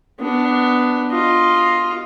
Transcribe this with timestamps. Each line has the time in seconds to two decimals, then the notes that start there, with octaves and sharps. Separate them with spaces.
0.19 B3 D4
1.11 F4 D#5